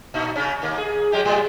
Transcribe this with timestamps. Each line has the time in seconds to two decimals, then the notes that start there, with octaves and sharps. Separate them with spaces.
0.14 A#2 D#4
0.36 C#3 C#4
0.62 D#2 A#3
0.78 G#4
1.12 F#3 G#3 G4
1.25 A2 G3